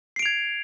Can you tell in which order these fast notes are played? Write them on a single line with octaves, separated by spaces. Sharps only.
C7 D7 F7 G#6